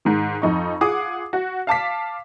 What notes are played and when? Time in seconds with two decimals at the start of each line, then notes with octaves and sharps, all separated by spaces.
0.05 G#2 D#3
0.42 F2 D#4 C#6
0.81 F4 G#4 F#5 D6 D#6
1.33 F#4
1.67 F5 A5 D6 B6